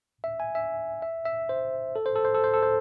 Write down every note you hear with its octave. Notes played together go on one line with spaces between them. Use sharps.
E5
G#5
E5
E5
E5
C5
A4
C5
A4
C5
A4
C5
A4
C5